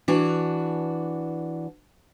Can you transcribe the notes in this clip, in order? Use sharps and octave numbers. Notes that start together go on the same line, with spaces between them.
E3 D4 F#4